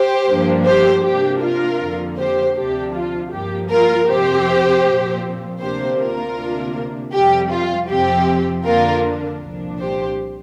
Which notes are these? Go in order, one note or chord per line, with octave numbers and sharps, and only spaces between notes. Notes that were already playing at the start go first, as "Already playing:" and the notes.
Already playing: G4 C5
G2 F3 A#3 D4
G4 C5
C3 A#3 D4 G4
F4 A#4
F2 D3 F3 A#3
G4 C5
D2 C3 F3 D4 G4
F4
G2 F3 A#3 G4
F4 A#4
F2 C3 F3 C4 G4 C5
A#2 F3 C4
D2 C3 A#3 D4 G4 C5
F4 A#4
D2 C3 A#3 D4
F2 C3 G3 G4
F4
F2 C3 F3 C4 G4
F2 D3 A#3 D4 F4 A#4
C2 A#2 F3 D4
G4 C5